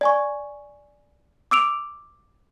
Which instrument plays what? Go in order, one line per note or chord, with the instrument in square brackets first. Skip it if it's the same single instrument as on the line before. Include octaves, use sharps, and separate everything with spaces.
[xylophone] D5 G#5 C#6
D6 E6 D7 F7